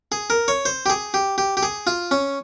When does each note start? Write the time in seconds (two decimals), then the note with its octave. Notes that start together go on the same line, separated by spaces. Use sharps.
0.12 G#4
0.30 A#4
0.48 C#5
0.66 C5
0.86 G4
0.90 G#4
1.14 G4
1.38 G4
1.57 G4
1.63 G#4
1.87 F4
2.11 C#4